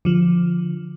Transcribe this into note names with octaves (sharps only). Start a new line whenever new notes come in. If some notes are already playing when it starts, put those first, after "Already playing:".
D3 F3